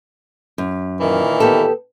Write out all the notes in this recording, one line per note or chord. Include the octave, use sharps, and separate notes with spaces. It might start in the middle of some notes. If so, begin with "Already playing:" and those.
F#2
A#2 D#3 E3
B3 G4 A4